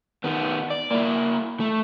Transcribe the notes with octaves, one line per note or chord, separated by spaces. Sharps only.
D#3 B3
D5
A#3 E4
A3